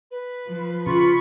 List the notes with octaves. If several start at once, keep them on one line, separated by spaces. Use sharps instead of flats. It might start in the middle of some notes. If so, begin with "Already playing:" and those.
B4
F3
C#3 F4 B5 C#6 B6